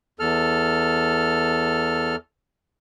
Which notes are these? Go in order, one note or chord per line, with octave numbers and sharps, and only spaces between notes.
E2 A4 F6